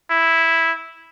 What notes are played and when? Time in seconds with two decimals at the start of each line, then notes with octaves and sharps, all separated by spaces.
0.10 E4